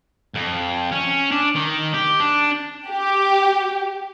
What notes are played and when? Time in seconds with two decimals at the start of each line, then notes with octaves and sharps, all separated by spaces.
0.35 F2
0.92 C#4
1.31 D4
1.56 D#3
1.94 G4
2.20 D4
2.88 G4